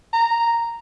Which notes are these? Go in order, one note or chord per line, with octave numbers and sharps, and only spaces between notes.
A#5